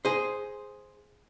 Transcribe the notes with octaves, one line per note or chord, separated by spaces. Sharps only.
G#4 C5